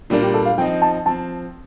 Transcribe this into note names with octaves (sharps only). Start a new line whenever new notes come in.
A#2 G3 A#3 D4
G4
A4
F5
F3 C4 D#4 G5
A5
F3 C4 A5